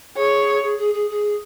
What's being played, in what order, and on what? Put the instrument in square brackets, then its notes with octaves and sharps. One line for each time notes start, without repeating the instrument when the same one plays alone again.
[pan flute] G#4 [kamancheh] C#5
[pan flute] G#4
G#4
G#4
G#4